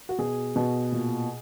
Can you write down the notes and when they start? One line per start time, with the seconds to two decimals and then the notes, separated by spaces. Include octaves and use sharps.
0.09 F#4
0.18 B2 G#4
0.56 B2
0.92 A#2